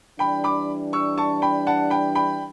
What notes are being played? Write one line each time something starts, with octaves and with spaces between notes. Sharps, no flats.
E3 G3 D4 G5 B5
B5 D6
C#6 E6
A5 C#6
G5 B5
F#5 A5
G5 B5
G5 B5